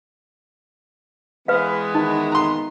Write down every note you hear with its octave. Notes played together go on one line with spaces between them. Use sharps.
E3 G#3 B3 B4 F5
D#3 D#4
A#5 C6